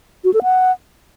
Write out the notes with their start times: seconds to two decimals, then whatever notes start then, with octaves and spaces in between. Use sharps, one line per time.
0.24 F#4
0.34 A4
0.43 F#5